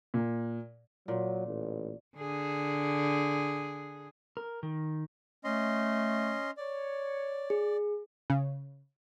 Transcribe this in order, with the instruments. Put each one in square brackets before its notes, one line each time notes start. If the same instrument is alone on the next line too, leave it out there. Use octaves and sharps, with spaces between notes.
[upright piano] A#2
[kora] A#2 [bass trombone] F#3
[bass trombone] A1
[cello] D3 G#4
[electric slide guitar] A#4
D#3
[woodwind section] A3 [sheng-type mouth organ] C#4 D#5 C6
[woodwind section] C#5 [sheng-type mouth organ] D5
[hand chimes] G#4
[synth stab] C#3